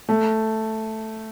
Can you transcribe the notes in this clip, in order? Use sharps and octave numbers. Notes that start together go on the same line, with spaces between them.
A3